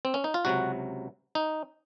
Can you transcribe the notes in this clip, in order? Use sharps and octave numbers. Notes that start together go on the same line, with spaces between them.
C4
C#4
D#4
F4
C#2 C3 F#3 F#4
D#4